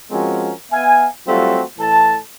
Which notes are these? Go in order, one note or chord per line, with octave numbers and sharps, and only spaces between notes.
F3 G#3 C4 C#4 F#4 A#4
B3 E5 F5 G#5
F#3 G3 A3 C4 F4 F#4
A2 E3 A4 A5